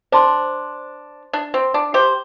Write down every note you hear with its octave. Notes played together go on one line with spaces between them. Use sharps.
D4 C5 A5 C6
D4
C4
D4
G4 C5